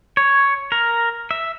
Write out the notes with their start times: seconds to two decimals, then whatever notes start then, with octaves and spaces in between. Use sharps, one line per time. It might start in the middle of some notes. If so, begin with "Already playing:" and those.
0.17 C#5
0.72 A#4
1.31 E5